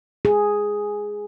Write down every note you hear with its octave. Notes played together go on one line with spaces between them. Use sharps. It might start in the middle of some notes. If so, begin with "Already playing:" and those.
G#4